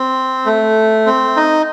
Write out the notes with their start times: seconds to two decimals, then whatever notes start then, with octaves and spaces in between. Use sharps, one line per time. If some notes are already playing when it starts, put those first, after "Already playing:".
Already playing: C4
0.46 A3
1.06 C4
1.37 D#4